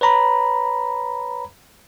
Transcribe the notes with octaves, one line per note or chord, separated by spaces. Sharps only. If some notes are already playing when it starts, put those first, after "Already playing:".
B4 C#5 A#5 B5